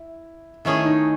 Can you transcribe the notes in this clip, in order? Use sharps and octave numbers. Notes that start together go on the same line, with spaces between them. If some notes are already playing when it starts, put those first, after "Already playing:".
Already playing: E4
D#3 A3 C#4 E4 G#4
D#4